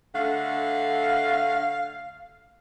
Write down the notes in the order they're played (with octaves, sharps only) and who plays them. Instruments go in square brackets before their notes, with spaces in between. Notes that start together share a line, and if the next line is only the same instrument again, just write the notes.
[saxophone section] D3 A3 F#5 [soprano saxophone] F5